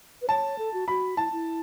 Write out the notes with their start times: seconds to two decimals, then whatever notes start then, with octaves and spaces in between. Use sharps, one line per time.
0.22 B4
0.29 C#5 A5
0.58 A4
0.74 F#4
0.88 F#4 B5
1.17 E4 A5
1.32 E4